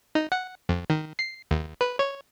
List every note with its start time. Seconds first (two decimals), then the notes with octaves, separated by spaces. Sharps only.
0.15 D#4
0.32 F#5
0.69 F2
0.90 D#3
1.19 C7
1.51 D#2
1.81 B4
1.99 C#5